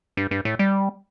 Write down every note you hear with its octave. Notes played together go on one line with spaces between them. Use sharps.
G2
G2
A2
G3